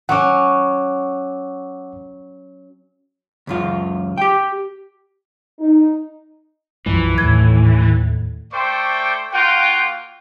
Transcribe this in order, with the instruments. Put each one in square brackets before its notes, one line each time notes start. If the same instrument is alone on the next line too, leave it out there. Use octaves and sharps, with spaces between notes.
[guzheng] F#3 C#4 [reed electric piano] F#5 C#6 D6
[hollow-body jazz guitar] C#2 F#2 F4
G4 G5
[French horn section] D#4
[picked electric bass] B1 F#2 G3 [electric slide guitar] E3 [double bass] F3
[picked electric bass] D#2 [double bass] A2 [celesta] G#6
[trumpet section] A3 C5 D5 G5 C#6 D6
A#3 F4 F#4 F#5 G5